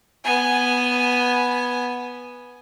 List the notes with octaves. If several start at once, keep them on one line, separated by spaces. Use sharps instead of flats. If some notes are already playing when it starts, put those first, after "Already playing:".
B3 G#5